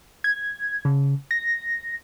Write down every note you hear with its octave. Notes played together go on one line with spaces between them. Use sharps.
G#6
C#3
A#6